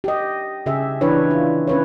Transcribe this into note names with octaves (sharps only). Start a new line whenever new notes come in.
G4 D#5
C#3 G4 G#4 E5
E3 D4 E4 B4 C#5
F4
C#4 B4 C#5